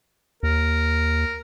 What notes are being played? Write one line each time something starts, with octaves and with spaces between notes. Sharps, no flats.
D#2 A#4